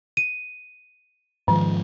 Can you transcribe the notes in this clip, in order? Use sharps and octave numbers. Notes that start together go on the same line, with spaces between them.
D#7
G#2 D#3 F3